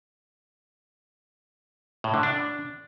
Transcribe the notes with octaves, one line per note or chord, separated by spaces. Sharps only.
A2
D3
D4